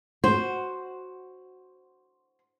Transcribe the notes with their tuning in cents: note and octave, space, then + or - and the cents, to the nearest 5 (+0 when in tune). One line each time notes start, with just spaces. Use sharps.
F#4 +0 C5 +0